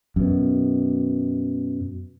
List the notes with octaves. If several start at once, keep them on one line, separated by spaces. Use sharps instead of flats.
F#2 B2